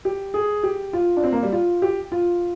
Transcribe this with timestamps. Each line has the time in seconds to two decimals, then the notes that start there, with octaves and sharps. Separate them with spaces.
0.05 G4
0.34 G#4
0.63 G4
0.93 F4
1.17 D4
1.24 C4
1.32 A#3
1.43 G3
1.52 F4
1.82 G4
2.12 F4